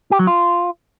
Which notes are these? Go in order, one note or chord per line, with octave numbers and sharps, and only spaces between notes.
G4
F#3
F4